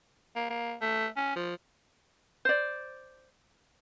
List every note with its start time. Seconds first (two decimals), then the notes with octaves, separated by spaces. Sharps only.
0.36 A#3
0.50 A#3
0.81 A3
1.17 C#4
1.36 F3
2.45 C5 D5